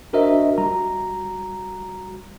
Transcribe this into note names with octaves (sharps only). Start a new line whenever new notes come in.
D4 F#4 A#4 C5 D#5 E5
G3 F#4 A#5